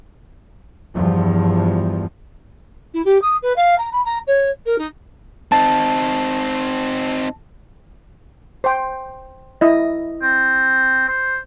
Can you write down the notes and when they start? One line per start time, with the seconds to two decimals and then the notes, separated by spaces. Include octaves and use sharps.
0.94 E2 G2 F3
2.93 E4
3.05 G4
3.21 D#6
3.42 B4
3.56 F5
3.78 A#5
3.92 B5
4.05 A#5
4.27 C#5
4.65 A#4
4.78 D#4
5.52 C4 D#4 A5
8.64 C5 G5
9.61 E4 D#5
10.23 C4
11.08 C5